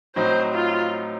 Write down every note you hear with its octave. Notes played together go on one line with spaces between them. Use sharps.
A2 F#3 C4 D#4 C5
F4